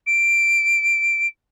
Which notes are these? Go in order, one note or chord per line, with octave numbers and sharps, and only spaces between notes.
D7